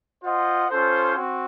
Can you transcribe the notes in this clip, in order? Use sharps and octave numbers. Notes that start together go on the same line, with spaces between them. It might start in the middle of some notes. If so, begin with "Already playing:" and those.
F4 C5 D#5 F#5
C#4 F4 A4 C5
C4 F#4